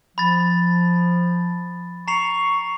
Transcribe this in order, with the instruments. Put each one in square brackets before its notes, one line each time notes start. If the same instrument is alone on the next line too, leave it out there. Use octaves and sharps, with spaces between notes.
[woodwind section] F3 [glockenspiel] B5 A6
[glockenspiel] A#5 C7 F7 [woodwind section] C#6